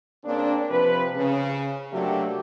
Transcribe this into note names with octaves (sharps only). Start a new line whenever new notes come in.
C#3 A#3 C4 D4
C3 F3 B4
C#3
C3 F#3 A3 A#3 D4 G4